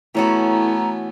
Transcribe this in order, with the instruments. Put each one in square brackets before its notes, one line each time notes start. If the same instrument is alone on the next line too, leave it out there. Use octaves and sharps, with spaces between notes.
[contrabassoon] A2 [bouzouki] E3 C#4 F#4 [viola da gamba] A3 B3 [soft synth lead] A#5